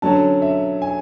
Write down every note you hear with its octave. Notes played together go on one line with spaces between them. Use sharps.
D3 F#3 C#4 A5
E5
G#5